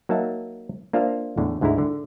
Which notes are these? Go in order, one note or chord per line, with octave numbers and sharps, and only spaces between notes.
F#3 A#3 D#4 E5 A5
A#3 D4 F4 C5 E5 F5
E2 A2 D3
D2 G#2 D3 G#3 E4 A#5
D3